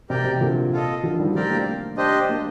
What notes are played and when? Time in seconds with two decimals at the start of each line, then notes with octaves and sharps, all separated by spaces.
0.09 C3 G4 A#4 D5 G5
0.24 C3
0.41 A#2 D3
0.73 F4 A4 D#5
1.03 D3 F3
1.19 D#3 G3
1.35 F3 A3 C4 G4 A#4 D5
1.50 A#3 D4
1.97 D4 G4 C5 D#5
2.29 A#3 D4